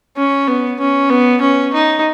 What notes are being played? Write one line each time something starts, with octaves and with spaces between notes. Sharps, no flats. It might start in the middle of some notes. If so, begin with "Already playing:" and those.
C#4
B3
C#4
B3
C#4
D#4